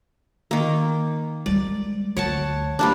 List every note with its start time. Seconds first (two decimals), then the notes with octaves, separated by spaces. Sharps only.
0.51 D#3 A#3
1.46 G3 G#3 D5
2.17 D2 F#3 C#5 F#5 A5
2.79 G3 A#3 D4